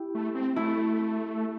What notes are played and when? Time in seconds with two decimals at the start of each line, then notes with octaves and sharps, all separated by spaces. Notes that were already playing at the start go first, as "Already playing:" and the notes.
Already playing: E4 G4
0.15 A3
0.35 C4
0.56 A3 E4